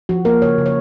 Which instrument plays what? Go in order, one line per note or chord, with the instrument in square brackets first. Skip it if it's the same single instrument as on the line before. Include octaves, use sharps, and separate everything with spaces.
[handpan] F3 F#4
A#3 A#4
C#3 C#5
C#3
C#5